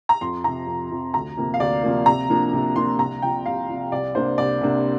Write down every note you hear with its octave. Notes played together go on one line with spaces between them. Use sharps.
A#5
F2 C6
C3 F3 A#5
F2
C3 F3
D2 A#5
C3 F3 A#3
F5
D2 D5
C3 F3 A#3
C3 A#5
F3 A#3 D4
C3
F3 A#3 D4 C6
C2 A#5
C3 F3 G5
C2 F5
C3 F3
C2 D5
C3 A#3 D4 C5
C2 D5
C3 A#3 D4